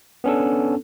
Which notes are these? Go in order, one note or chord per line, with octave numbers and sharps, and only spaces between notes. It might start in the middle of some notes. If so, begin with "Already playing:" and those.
B3 C#4 D4 A4